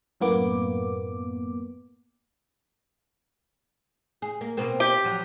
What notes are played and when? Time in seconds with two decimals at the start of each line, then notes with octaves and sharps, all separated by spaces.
0.20 F#2 A2 A#3 B3 D6
4.22 G#4
4.41 A#3
4.57 B2 A#3 C4
4.80 G4
5.04 F3 F#3